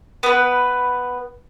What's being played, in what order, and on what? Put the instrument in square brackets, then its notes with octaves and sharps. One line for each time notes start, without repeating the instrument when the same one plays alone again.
[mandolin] B3 B4